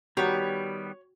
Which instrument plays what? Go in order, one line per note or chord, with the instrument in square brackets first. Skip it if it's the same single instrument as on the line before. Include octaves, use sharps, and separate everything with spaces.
[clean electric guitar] D#3 G3 B3 [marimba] F#4 F#5 A#5 [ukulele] G4 [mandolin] C#5